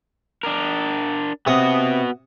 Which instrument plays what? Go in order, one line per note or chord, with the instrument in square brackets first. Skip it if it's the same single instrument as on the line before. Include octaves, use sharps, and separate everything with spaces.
[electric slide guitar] D4 A#4
[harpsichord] C3 C#6 D#6 [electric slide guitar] B3 F#4